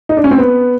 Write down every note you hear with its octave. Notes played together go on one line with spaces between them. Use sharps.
D#4
D4
C#4
C4
B3